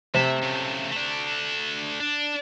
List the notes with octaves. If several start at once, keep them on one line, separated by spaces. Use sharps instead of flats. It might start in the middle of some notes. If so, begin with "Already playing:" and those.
C3 A3 E5
C#3 A3
A3 D4
D4